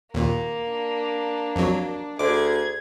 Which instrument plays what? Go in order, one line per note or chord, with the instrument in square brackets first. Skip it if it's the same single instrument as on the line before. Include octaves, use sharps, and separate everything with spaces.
[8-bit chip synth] D#2 A#2 [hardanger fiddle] A#3
[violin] D4
[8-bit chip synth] F2 F#3
[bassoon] D2 [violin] G#4 G#6 [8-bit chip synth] D6